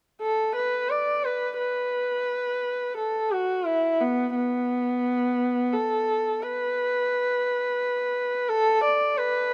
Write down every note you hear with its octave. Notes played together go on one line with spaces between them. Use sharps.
A4
B4
D5
B4
B4
A4
F#4
E4
B3
B3
A4
B4
A4
D5
B4